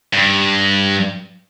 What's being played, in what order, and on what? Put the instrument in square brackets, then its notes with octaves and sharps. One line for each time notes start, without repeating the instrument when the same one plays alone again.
[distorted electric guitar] G2